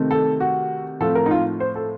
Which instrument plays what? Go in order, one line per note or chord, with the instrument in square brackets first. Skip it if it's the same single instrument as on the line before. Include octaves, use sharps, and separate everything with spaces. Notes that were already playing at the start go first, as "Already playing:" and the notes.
Already playing: [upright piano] C3 D#3 A3 C4
A4
F#4
A2 F3 A3 C4 A4
A#4
D#4
F4
C5
A4